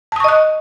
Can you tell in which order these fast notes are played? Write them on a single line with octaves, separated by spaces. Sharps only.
A5 D#6 C#6 D#5 F#6